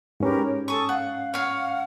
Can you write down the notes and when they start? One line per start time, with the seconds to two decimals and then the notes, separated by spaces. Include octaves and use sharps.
0.20 G#2 C#4 G4 A#4 B4
0.43 C#5
0.68 A4 G#5 A5 C#6 D#6
0.89 F5 F#5
1.34 C#5 F5 F#5 F6